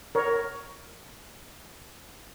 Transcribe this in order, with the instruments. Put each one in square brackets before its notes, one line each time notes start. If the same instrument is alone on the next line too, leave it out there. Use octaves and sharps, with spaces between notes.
[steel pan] A#4 C#5